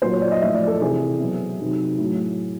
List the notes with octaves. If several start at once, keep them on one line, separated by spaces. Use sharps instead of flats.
A#2 F#3 C5
C#5
D5
D#5
A2 F3 E5
D5
A4
C3 E3 G#4
B2 F#3
C3 D#3 F#3
A2 F#3